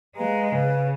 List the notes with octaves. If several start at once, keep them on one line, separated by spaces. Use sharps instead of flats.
G#3 G#4 B4 F5 A#5
C#3 G#4 B4 F5